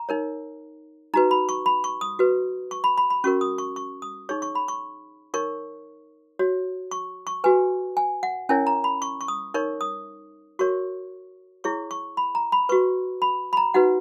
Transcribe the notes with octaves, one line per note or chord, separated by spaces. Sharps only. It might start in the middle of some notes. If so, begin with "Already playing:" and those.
Already playing: A#5
D#4 A#4 C#5
D#4 F#4 B4 A#5
B5
C#6
B5
C#6
D#6
F#4 B4
C#6
B5
B5
B5
C#4 F#4 A#4 C#6
D#6
C#6
C#6
D#6
D#4 G#4 C#5 C#6
C#6
B5
C#6
D#4 A#4 C#5 C#6
F#4 C#5
C#6
C#6
F#4 B4 G#5
G#5
F#5
C#4 E4 A#4 C#5 G#5
A#5
B5
C#6
C#6
D#6
D#4 A#4 C#5 C#6
D#6
F#4 A#4 C#5 C#6
E4 G#4 C#5 C#6
C#6
B5
A#5
B5
F#4 B4 C#6
B5
B5
A#5
D#4 F#4 B4 F#5